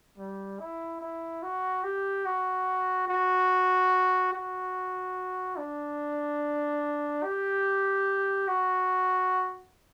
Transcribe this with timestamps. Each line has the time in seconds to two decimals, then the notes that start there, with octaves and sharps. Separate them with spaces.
0.18 G3
0.60 E4
1.01 E4
1.43 F#4
1.84 G4
2.26 F#4
3.08 F#4
4.33 F#4
5.57 D4
7.23 G4
8.48 F#4